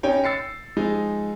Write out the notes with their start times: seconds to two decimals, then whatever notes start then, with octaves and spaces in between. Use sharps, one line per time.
0.03 C#4 D#4 C#5 G5
0.24 E6 A6 C7 C#7
0.77 F3 G#3 D#4